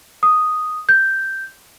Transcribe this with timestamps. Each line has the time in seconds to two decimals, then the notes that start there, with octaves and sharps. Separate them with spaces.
0.23 D#6
0.89 G6